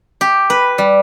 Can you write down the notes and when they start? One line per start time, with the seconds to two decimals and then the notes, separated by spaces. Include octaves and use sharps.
0.21 G4
0.50 B4
0.78 G3